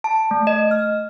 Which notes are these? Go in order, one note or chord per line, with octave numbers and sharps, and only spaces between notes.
A5
A3
D#5
F6